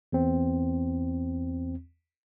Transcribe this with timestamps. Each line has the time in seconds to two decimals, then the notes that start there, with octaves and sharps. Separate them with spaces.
0.13 E2 C4